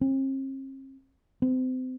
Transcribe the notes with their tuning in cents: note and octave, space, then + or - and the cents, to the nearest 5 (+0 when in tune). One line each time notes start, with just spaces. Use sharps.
C4 +45
C4 -35